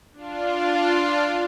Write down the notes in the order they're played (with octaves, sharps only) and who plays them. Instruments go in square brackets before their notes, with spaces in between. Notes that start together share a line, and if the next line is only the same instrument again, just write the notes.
[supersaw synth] D4 F4